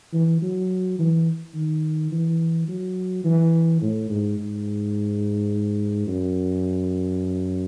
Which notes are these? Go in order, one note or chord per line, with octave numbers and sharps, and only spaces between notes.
E3
F#3
E3
D#3
E3
F#3
E3
A2
G#2
G#2
F#2